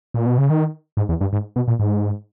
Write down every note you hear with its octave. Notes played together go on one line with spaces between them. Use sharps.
A#2
B2
C#3
D#3
G#2
E2
G2
G#2
B2
A#2
G#2